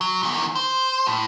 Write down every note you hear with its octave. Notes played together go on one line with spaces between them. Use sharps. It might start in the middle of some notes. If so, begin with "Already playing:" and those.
F#3
E2 D#3
C5
A2